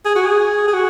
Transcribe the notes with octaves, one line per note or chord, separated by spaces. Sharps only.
G#4
F#4
G#4
G#4
F#4